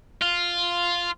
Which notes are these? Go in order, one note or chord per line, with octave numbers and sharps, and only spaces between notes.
F4